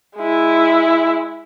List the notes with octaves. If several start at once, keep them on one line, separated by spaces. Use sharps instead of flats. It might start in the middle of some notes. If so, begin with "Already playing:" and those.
G#3 E4